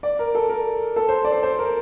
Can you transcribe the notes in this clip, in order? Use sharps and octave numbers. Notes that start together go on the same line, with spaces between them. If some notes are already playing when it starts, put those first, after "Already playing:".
D5
A#4
A4
A#4
A4
C5
D5
C5
C5
A#4